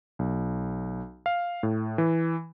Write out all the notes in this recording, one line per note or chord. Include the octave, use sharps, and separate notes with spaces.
B1
F5
A2
E3